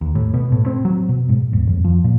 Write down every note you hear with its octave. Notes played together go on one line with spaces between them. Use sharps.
D#2
A2
B2
A2
C4
F#3
B2
G#2
D#1
F2
F3
A#2